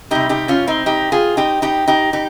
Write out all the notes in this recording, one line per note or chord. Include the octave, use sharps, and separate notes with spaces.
C3 G3 D#4 G4
D#4 G4
C#4 F4
C4 D#4
D#4 G4
F4 G#4
D#4 G4
D#4 G4
D#4 G4
D#4 G4